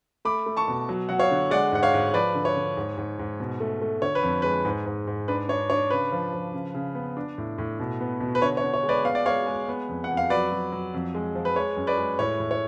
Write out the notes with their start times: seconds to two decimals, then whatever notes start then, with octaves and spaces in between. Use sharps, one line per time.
0.25 A3 B5 D6
0.46 A3
0.57 A5 C#6
0.68 B2
0.89 F#3
1.09 F#3 F#5
1.19 C#5 F5
1.31 D3
1.51 G#3 D5 F#5
1.72 G#2 F#5
1.83 C#5 F5
1.94 G#2
2.14 F3 B4 D5
2.35 D3
2.45 C#5
2.56 D3
2.77 G#2
2.97 G#2
3.19 G#2
3.40 B2
3.60 A3
3.81 A3
4.02 D3 C#5
4.15 B4
4.23 F2
4.42 G#3 B4
4.65 G#2
4.86 G#2
5.07 G#2
5.28 D4 B4
5.49 D4 C#5
5.70 D4 C#5
5.90 C#3 B4
6.12 F3
6.33 F3
6.53 C#3
6.74 C#3
6.95 B3
7.17 D4
7.38 A2
7.58 A2
7.80 B2
8.01 B3
8.21 B2
8.35 B4
8.42 D3 C#5
8.57 C#5
8.63 D3
8.74 C#5
8.83 G#3
8.89 B4 D5
9.05 B3 F5
9.15 D5
9.26 G#3 C#5 F5
9.46 G#3
9.68 B3
9.89 F2
10.04 F#5
10.10 F2
10.17 F5
10.30 F#3 B4 D5
10.51 F#3
10.72 F#3
10.94 F2
11.14 G#3
11.35 F3
11.45 B4
11.56 G#3 C#5
11.77 F#2
11.87 B4 D5
11.98 G#3
12.19 A2 C#5
12.40 A2
12.51 C#5